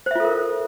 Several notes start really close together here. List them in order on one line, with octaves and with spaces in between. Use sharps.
C5 E5 F4 A4 A#4